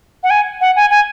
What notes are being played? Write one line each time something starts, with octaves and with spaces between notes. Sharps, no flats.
F#5
G#5
F#5
G#5
G#5